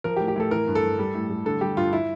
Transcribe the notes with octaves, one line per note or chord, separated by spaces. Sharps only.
F3 A#4
G4
A2
G4
A2 A4
E3 A#4
G2
A4
G2
G3
A2
G3
D3 A4
G3 G4
G2 F4
E4